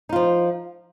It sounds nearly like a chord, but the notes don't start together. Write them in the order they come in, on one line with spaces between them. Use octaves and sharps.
D#4 F4 F3